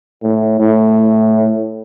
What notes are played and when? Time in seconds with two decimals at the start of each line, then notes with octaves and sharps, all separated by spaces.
0.23 A2
0.60 A2